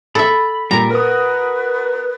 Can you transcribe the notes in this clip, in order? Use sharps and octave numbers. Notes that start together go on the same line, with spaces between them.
A4 E5 B5
A#2 G3 A#4 A#5
F#4 A#4 B4 D#6